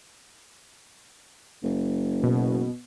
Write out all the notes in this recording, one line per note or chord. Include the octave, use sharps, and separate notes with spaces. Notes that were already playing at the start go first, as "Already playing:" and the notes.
F#1
B2